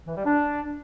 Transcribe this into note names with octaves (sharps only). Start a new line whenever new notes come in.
E3
G3
D4